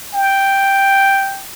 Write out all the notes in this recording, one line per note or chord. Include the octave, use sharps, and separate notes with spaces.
G5